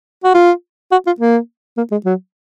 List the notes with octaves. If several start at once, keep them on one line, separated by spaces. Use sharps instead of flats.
F#4
F4
F#4
F4
A#3
A#3
G#3
F#3